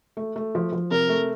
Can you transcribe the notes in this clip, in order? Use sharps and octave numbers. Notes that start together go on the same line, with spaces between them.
A3
A3
F3
F3
C3 A#4
A3